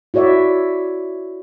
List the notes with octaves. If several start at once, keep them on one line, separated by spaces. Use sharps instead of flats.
E4 F#4 C#5 D5 E5